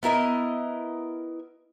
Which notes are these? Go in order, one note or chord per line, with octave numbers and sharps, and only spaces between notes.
B3 E4 A#4 D#5